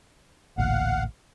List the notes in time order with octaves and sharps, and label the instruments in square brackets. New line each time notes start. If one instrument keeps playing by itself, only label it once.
[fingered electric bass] A1 D2 A#2 [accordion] F5 F#5